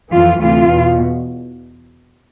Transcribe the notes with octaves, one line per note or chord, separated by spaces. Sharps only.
F2 E3 F4
D2 C3 E3 F4
E2 B2